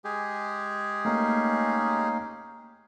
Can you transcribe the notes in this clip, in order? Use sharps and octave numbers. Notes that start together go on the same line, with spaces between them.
G#3 G4 G#4
A3 A#3 C#4 D#4 F5